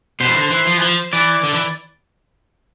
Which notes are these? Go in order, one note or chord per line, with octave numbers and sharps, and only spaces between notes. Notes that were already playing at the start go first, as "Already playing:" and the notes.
B2 C5
E3
D3
E3
F3
E3
F3
E3 D5
D3
E3